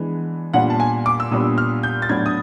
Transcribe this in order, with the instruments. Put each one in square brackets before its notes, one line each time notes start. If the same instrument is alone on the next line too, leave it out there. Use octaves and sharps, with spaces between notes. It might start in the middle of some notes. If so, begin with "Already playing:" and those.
Already playing: [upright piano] E3 G#3 B3 D4
A#2 G3 B3 D4 F#5
A5
G#5
D6
E6
A#2 G3 B3 D4 D#6
F6
G6
A6
A2 F#3 B3 D4 G#6
D#6